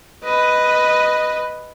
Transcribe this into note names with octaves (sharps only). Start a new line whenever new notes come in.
B4 D#5